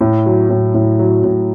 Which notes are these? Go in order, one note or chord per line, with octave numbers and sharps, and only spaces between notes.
A2
F#3
A2
A2
F#3
A2